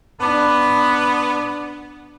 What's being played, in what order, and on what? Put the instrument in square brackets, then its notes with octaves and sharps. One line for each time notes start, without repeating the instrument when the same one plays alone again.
[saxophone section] B3 [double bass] D4